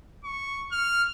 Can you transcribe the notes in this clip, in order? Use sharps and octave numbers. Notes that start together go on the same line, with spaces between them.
C#6
F6